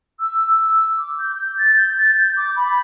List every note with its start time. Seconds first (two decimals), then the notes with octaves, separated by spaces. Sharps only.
0.19 E6
0.58 E6
0.97 D6
1.18 G6
1.37 G6
1.57 A6
1.76 G6
1.97 A6
2.16 G6
2.36 D6
2.56 B5